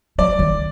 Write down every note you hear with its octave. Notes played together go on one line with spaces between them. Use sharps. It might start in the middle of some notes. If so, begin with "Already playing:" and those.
F#3 D5
D#3